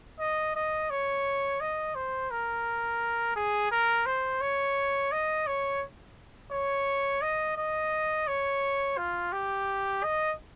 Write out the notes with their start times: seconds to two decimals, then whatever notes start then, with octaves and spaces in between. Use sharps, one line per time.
0.20 D#5
0.56 D#5
0.90 C#5
1.61 D#5
1.95 C5
2.31 A#4
3.36 G#4
3.71 A#4
4.06 C5
4.41 C#5
5.12 D#5
5.47 C#5
6.52 C#5
7.22 D#5
7.57 D#5
8.28 C#5
8.97 F4
9.33 G4
10.04 D#5